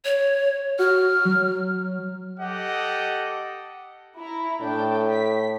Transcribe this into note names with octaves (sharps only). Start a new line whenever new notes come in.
C#5
F#4 F6
F#3
G4 A4 D#5 F#5
E4 A#5
A2 D4 G5 A5
B6